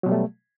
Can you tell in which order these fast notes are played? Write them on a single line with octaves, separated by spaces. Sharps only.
F#3 B2 G3 A3